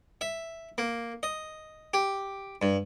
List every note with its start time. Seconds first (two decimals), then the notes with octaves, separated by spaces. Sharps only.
0.21 E5
0.78 A#3
1.23 D#5
1.94 G4
2.62 G2